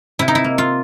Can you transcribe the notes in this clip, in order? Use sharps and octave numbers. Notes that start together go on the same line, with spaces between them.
C3 E4
D#4
E4
A#3
F4